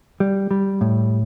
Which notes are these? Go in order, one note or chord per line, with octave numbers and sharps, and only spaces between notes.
G3
G3
A2